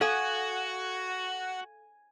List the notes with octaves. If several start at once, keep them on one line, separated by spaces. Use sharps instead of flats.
F#4 A4 F5 F#5 G#5 D#6